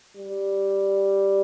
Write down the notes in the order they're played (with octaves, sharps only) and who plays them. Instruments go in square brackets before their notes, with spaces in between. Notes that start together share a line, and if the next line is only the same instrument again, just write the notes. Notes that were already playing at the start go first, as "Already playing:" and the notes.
[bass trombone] G3